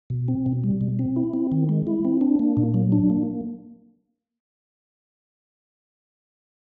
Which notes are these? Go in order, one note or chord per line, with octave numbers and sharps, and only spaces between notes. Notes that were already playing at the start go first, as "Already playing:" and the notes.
B2
C4
B2
G3
B2
C4
E4
C4
D#3
G#3
E4
C4
D4
A#3
A#2
F#3
D4
A#3